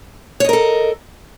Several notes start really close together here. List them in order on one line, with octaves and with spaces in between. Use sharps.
C#5 D#5 A#4 A4